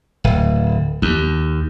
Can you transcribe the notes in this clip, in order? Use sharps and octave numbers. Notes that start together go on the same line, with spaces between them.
D1
D#2